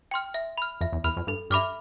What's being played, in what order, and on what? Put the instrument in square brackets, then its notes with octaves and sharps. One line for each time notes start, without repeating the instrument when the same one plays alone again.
[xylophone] G5 C6 F6
E5
B5 F6
[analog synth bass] F2 [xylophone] E5
[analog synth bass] E2
[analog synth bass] E2 [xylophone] B5 F6
[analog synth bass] F2
[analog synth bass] G2 [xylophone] A4
[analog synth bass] G2 [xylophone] E5 B5 D6 F6